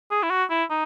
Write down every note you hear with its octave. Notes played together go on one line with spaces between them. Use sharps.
G#4
E4
F#4
E4
D#4